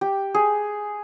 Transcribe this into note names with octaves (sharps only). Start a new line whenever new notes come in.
G4
G#4